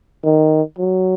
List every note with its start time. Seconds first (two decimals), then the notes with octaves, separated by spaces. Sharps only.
0.24 D#3
0.78 F#3